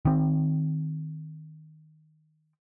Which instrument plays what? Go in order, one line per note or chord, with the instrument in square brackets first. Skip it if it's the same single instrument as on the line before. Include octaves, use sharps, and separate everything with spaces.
[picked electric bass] D#3 C4